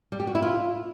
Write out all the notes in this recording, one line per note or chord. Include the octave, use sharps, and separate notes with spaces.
G3
G4
F#4
E4
F4